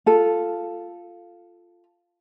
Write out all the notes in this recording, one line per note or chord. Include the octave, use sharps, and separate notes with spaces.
F4 A4